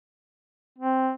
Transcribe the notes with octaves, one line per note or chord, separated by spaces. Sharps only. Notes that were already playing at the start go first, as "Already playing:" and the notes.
C4